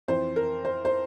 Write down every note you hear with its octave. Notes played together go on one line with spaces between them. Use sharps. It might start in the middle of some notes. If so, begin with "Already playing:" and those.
F2 E3 C5
A#4
C5
C5